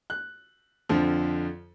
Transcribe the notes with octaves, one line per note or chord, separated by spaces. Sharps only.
F#6
F2 D3 F3